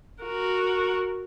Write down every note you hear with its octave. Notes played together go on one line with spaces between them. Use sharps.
F#4 A#4